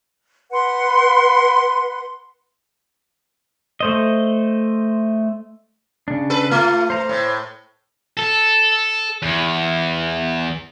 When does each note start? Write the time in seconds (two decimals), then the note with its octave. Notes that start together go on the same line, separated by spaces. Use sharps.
0.52 B4 F#5 C6
3.80 A3 C5 D#5
6.08 C#3 D4
6.30 A4 B4
6.51 A3 F4
6.90 C5 A#5
7.09 A2
8.17 A4
9.22 E2